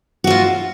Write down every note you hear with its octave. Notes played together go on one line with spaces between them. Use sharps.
F4 F#4 E5